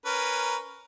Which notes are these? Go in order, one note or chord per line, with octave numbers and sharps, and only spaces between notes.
C#4 A#4 B4